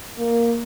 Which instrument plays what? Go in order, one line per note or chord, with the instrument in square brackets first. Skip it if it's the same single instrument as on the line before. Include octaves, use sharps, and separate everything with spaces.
[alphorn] A#3